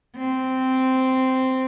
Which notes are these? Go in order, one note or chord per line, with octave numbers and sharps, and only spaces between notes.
C4